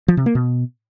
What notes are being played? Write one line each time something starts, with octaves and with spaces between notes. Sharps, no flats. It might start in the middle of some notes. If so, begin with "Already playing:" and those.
F3
C3
A#3
B2